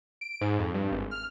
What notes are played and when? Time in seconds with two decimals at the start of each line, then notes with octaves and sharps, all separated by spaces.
0.21 D7
0.41 G#2
0.59 F2
0.74 G2
0.91 G#1
1.11 F6